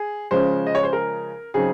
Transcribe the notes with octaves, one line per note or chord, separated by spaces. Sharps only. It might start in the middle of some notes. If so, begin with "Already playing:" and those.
Already playing: G#4
C#3 F3 G#3 C#4 C5
D#5
C#5
C5
A#4
C#3 F#3 C4 D#4 G#4